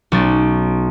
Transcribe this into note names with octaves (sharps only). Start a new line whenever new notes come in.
B1 C#4 A6